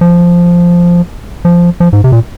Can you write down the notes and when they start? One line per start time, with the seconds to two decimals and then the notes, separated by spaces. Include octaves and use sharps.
0.01 F3
1.45 F3
1.80 F3
1.93 G#2
2.04 C3
2.12 A#2